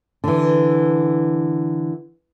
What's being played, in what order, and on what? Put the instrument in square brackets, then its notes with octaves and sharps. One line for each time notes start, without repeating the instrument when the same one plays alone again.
[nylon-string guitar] D3 E3